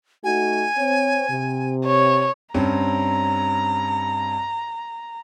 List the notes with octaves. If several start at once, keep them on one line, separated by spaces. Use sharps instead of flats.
A3 D#4 F#4 G#5
C4 C#5
C3
C#5
G2 C4 C#4 A#5